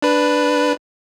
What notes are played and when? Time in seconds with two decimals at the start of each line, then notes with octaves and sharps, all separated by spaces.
0.02 D4 B4